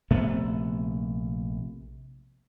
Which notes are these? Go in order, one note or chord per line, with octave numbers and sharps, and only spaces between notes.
A#1 C3 A3 B3